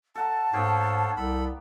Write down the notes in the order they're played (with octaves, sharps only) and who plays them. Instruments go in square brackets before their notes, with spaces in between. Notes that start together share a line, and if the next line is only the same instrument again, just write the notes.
[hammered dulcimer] A4 F#5 A#5 [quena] A5
[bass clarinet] G#2 [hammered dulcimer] A#3 B3 G4 [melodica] A4 C#5 F5
[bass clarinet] C2 [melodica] A4 B5